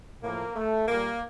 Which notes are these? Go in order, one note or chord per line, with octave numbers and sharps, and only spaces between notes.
A2 F3 A#3
A3
A#2 G3 A#3